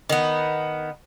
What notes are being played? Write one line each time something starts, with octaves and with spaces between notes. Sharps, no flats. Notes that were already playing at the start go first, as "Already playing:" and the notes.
D#3 B3